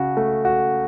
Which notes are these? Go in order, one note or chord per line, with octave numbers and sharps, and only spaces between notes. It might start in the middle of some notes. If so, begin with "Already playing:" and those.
Already playing: C#3 F#4
A3
F#4